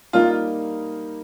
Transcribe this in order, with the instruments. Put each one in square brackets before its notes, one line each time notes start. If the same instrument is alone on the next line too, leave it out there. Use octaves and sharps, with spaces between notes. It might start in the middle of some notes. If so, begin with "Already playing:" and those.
[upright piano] G3 A#3 D#4 [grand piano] F4